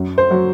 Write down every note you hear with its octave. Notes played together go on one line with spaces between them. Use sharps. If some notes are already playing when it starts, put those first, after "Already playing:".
Already playing: F#2
C5
F#3